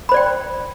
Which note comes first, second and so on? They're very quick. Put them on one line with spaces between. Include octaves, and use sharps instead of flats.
B5 C5 D5 G5